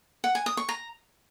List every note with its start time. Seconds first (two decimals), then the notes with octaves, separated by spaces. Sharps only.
0.24 F#5
0.35 G#5
0.46 D#6
0.57 C#6
0.69 A#5